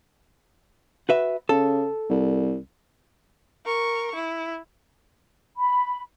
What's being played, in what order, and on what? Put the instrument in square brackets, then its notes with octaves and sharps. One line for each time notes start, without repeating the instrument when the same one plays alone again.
[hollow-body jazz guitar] F#4 B4 E5
[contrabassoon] C#3 [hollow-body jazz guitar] A4
[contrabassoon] C2
[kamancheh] A#4 C#6
E4
[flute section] B5